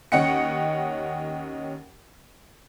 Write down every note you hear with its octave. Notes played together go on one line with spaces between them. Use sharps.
D#2 C#4 D#5 F#5 G5 C#7